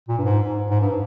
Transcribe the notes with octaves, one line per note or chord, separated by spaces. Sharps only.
A#2
G2
G#2
G#2
G2